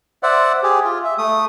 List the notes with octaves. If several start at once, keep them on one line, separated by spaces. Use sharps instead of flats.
C5 D5 E5 F#5
G4 G#4
F4
E5
A3 D#6